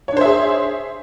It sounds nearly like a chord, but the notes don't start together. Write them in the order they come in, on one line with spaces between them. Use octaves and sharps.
C#5 D4 C5 E5 G#4